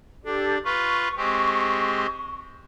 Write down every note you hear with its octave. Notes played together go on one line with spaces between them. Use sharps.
D4 G4 A4
F4 B4 C#6
G#3 C4 G4